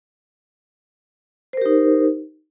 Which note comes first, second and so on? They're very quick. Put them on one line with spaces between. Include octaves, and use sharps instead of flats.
C5 A#4 G4 D#4